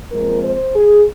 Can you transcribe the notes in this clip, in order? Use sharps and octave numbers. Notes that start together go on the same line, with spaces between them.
A#2 F3 G#3 C4 A#4
C5
G#4